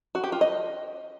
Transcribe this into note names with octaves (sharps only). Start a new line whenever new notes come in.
F#4
G4
F4
D#5